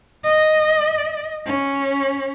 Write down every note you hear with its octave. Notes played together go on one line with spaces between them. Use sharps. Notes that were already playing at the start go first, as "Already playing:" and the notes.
D#5
C#4